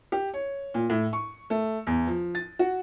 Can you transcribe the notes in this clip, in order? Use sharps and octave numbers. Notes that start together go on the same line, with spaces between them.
G4
C#5
A#2
A2
C#6
A3
E2
F3
A6
F#4